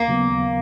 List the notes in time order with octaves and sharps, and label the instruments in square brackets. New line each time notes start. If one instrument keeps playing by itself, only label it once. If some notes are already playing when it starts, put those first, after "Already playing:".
Already playing: [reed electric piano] D#2 [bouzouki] A#3
[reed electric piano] C#3 F#3 B3
D#2